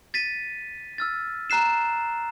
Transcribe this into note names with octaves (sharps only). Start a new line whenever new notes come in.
A6 B6 D#7
E6 F6 A6
A#5 F#6 C7 E7